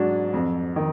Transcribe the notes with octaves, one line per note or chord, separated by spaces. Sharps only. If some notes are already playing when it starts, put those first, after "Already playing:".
Already playing: G#2 F#3 D4
F2
D#3